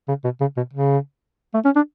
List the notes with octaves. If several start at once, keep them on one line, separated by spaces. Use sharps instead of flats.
C#3
B2
C#3
B2
C#3
A3
C#4
D4